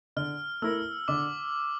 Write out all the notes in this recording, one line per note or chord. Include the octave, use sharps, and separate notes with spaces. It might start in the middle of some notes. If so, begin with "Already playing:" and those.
D3 F6
A3 E4 A#4 E6
D3 D6